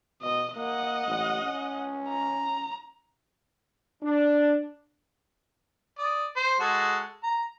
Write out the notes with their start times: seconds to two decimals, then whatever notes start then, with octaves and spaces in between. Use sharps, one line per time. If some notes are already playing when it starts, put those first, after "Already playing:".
0.22 B2 D#5
0.56 A#3 D#5 F#5
1.07 A1
1.42 C#4
2.09 A#5
4.03 D4
5.98 D5 D#6
6.36 C5
6.60 G#3 F#4 A4
7.23 A#5